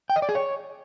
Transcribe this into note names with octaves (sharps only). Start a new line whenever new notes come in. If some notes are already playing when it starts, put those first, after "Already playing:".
G5
D#5
D5
G#4
C#5